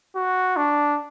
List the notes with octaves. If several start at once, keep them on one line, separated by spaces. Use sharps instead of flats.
F#4
D4